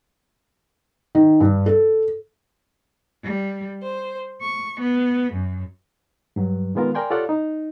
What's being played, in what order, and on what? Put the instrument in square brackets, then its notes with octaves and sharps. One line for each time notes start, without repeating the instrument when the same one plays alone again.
[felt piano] D#3
G2
A4
[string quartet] G3
C5
C#6
B3
F#2
[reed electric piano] G2 F#3
D#3 G#3 B3 F4 A#4
A#4 D5 G5 G#5 C6
F4 G4 A4 C#5 D5 F#5
D#4